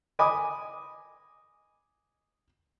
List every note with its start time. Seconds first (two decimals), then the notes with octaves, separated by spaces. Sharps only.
0.19 D#5 G#5 B5 D6 D#6